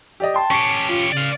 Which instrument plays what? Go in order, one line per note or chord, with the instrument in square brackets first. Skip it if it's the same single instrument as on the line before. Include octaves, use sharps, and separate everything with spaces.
[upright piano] G4 D5 D#5
[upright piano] G5 C6 [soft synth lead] A5
[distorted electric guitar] C#4 G4 [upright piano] C#6 C7
[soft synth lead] F4
[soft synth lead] C#3 [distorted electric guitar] D5 F5